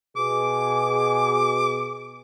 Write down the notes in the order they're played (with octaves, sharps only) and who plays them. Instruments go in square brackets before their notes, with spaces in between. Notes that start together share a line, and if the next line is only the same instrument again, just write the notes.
[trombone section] B2 G#4 [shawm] D6